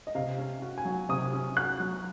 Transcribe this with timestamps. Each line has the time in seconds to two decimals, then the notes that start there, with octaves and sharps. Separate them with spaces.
0.07 D#5
0.15 C3 F5
0.38 C#4
0.62 F#4
0.78 G#5
0.85 F#3
1.09 C3 D#6
1.33 C#4
1.56 F#4 F#6
1.80 F#3